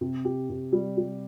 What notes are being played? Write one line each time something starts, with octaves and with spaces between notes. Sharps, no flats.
C3
G4
C3
G3
G3